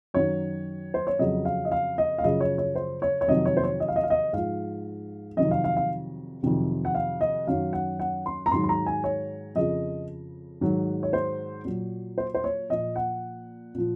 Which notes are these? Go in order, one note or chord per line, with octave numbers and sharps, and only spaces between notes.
F#2 D#3 F#3 C#5
C5
C#5
F2 C#3 F#3 D#5
F5
D#5
F5
D#5
F5
F#2 C#3 F3 D#5
C#5
C#5
C5
C#5
C#5
F2 C3 D#3 F#3 D#5
C#5
C5
C#5
D#5
F5
D#5
F5
D#5
G#2 F3 F5
F2 C3 D#3 F#3 D#5
F5
F5
F5
F2 C3 D#3 F#3
F#5
F5
D#5
F#2 D#3 F#3 F5
F#5
F#5
C6
A#5
G#2 D#3 F#3 C6
C6
A#5
G#5
C#5
F2 C#3 F3 D#5
G#2 D#3 F#3
C#5
C5
A#2 F#3
C5
C5
C#5
A#2 F3 D#5
F#5
A#2 F3